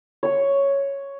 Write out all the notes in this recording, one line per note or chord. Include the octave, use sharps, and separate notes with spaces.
C#5 C#6